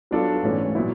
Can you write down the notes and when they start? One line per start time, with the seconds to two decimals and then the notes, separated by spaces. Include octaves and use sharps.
0.11 F#3 B3 D4 F4 A4
0.43 G#2 E3 A3 C#4
0.75 A#2 F#3 B3 E4